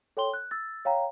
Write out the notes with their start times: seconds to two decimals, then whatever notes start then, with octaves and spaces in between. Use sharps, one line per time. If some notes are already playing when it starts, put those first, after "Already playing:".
0.17 A4 C#5 G5 C6 G7
0.34 F#6
0.51 E6 A6
0.85 C#5 F5 G5 A#5